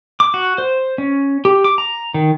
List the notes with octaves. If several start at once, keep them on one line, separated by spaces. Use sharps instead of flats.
D6
F#4
C5
C#4
G4
D6
A#5
D#3